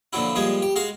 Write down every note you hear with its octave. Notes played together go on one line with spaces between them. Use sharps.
A#2 D3 F3 F#3 E4
A#2 F3 G3 G#3 G#4
G4
G#3 F#4 F5 A5